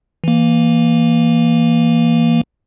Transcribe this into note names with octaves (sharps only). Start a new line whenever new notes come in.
E3 A#3